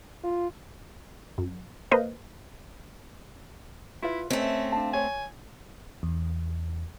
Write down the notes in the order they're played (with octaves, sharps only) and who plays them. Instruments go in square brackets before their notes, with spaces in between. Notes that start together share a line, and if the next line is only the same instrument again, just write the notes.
[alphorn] F4
[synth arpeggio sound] F#2
A#3 B4 C5 D#5 F5
[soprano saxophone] E4 [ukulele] F4 B4 E5
[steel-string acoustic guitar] A3 C4 [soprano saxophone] C#4 [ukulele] B4 C5 D#5
[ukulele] D4 F5 A5
[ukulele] C#5 [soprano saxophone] G#5
[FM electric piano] E2